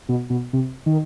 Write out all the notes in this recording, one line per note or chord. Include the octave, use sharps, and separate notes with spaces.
B2
B2
C3
D#3